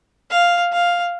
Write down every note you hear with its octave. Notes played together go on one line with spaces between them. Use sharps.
F5
F5